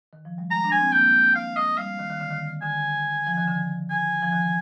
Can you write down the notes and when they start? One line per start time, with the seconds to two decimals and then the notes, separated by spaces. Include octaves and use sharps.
0.13 D#3
0.25 F3
0.38 G3
0.50 G#3 A#5
0.64 D4
0.72 G#5
0.79 C4
0.92 A#3 G5
1.35 F5
1.57 D#5
1.78 G3 F5
1.99 D#3
2.10 D#3
2.20 D3
2.31 D#3
2.62 D3 G#5
3.27 F3
3.37 D#3
3.47 D3
3.90 G#5
4.22 F3
4.33 D#3